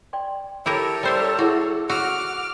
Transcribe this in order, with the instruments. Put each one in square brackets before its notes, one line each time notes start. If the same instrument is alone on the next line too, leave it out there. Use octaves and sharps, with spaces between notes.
[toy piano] D5 G5 C6
[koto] E4 G4 A#4 [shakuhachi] A4 [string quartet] C#5
[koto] G3 C5 E5 [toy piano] A#5
[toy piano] E4 G#4 E5 [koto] F#4
[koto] F#4 [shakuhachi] F#5 [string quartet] D6 F6 [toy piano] E6